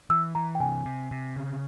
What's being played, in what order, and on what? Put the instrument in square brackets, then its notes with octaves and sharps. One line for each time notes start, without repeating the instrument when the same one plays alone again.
[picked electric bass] E3 [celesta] E6
[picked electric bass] E3 [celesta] A#5
[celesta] G5
[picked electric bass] C3 [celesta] G#5
[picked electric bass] C3
C3
C#3